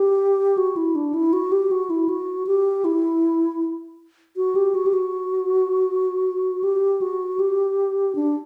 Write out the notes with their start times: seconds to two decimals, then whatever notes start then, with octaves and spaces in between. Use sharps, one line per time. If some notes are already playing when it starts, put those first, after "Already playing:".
Already playing: G4
0.58 F#4
0.76 E4
0.95 D4
1.14 E4
1.33 F#4
1.52 G4
1.71 F#4
1.90 E4
2.09 F#4
2.47 G4
2.85 E4
4.36 F#4
4.55 G4
4.75 F#4
4.86 G4
4.93 F#4
6.63 G4
7.02 F#4
7.39 G4
8.15 D4